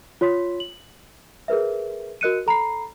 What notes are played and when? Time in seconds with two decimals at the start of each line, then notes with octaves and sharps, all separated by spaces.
0.21 F4 C#5 C6 B6
0.60 F#7
1.48 G#4 A#4 B4 E5
2.21 F#4 A#4 D#5 F#6 C#7 D#7
2.46 A4 A#5 B5 C7